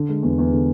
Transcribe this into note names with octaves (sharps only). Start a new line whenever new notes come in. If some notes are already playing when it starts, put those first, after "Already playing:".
Already playing: D3
G#3
E2
E2
D3